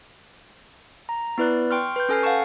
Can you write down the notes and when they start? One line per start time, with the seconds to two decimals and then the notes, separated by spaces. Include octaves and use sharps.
1.09 A#5
1.38 B3 E4 B4 D5 F#6
1.71 G5 C6 C#6 F6
1.96 B4 G6
2.09 C#4 A4 G#5 F6 C7
2.23 F5 F#5 G#5 A5 C#6